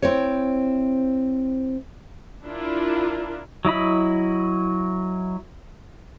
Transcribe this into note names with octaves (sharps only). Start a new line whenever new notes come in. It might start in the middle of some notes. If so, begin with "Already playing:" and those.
C4 E4 C5 C#5
D4 E4 F4 A#4
F#3 E4 D#5 B5